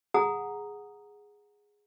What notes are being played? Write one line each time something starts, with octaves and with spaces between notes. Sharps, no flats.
G#4 F#5 A#5 D#6